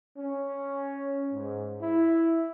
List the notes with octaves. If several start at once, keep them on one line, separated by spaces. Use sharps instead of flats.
C#4
G#2
E4